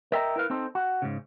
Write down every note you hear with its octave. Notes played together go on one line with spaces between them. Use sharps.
A#4 D#5 E5 G5 G#5 A#5
E4 A#4 B4 F5
C4 D#4 A4 C5
F#4
G#2 C#3